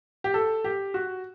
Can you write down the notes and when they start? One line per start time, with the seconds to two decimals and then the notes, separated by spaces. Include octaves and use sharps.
0.24 G4
0.34 A4
0.64 G4
0.94 F#4